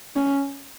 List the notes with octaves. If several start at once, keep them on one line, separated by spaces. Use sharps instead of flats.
C#4